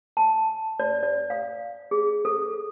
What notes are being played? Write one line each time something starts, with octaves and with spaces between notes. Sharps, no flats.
A5
D5
D5
F5
G#4
A4